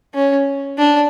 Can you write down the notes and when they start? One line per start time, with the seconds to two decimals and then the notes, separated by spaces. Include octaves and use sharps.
0.14 C#4
0.79 D4